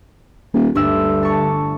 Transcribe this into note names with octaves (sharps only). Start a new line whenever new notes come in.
D#1
G1 D2 G2 E6
A5 C#6